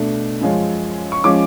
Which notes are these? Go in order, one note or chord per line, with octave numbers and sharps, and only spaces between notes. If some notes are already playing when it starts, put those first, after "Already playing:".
Already playing: B2 A3 D4
F#2 F3 G#3 C#4
C#6
F3 G#3 C#4 D6